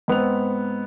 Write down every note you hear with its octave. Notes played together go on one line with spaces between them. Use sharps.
G#2 B3 C4 F7